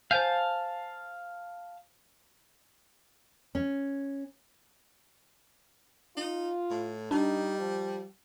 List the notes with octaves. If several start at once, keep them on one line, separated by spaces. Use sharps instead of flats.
C5 F5 G#5 A5 G6
C#4
D#4 F4
A2
G3 D4 D#4
F3